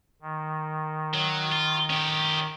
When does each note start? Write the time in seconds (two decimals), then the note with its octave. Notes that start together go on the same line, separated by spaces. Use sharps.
0.22 D#3
1.14 F#3
1.52 F4
1.90 C#4 G4